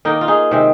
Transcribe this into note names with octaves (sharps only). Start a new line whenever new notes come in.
D#3 A#3 D#4
F4
D#4 G#4
C3 D#3 G#3 C4